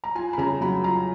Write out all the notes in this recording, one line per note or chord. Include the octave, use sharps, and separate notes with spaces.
A#5
F4 G#5
B5
C#3 A#5
F#3 B5
F4 A#5